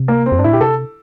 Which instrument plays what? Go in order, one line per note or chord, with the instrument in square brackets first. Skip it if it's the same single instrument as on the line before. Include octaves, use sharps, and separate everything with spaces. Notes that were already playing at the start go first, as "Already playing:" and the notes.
Already playing: [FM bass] C3
[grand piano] A#3
C4
[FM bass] F2
[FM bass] G2 [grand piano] D4
[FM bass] A2 [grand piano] E4
[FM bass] A#2 [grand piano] G4
[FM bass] C3 [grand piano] A4